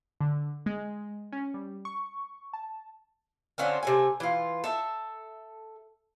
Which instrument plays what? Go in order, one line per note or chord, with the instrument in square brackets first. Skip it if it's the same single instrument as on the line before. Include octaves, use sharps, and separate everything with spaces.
[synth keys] D3
G#3
C#4
G3
C#6
A5
[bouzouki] D3 C4 C#4 F4
C3 A3 G#5
E3 F4
A4 E5